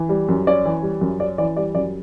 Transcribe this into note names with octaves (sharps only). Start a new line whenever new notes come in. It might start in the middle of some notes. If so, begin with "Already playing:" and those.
Already playing: E3
G3
F#2
C#4 D5
E3
G3
F#2
C#4 D5
E3 D5
G3 D5
F#2 D5